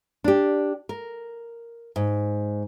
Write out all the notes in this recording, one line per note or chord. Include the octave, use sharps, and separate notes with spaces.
D4 G4
A#4
G#2